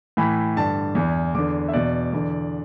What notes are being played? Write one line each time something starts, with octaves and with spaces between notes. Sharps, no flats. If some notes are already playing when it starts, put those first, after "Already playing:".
A2 E3 B5
G2 D3 A5
E2 E3
E2 D3 D6
E5
E2 B2 D5
E2 D3